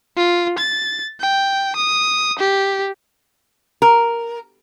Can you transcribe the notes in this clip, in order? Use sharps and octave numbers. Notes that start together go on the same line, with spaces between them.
F4
A6
G5
D#6
G4
A#4